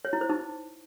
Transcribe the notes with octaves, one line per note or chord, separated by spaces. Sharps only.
C#5
E4
C5
D#4